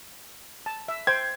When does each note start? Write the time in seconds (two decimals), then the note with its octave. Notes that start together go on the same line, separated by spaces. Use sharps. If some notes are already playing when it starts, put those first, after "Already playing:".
0.66 A5
0.88 E5
1.07 C5 G5 G#6